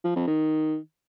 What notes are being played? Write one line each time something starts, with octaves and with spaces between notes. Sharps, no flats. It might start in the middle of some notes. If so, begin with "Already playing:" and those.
F3
F2
D#3